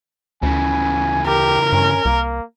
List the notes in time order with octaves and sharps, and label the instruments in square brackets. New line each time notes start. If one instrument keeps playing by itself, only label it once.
[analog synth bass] D2 [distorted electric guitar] C#3 E3 [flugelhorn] G#5
[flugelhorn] G4 [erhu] A#4
[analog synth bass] G2 [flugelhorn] C#4
[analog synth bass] C2 [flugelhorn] A#3